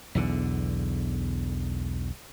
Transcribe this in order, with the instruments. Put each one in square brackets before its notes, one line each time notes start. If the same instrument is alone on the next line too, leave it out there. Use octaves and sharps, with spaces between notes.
[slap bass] B1 E2 D3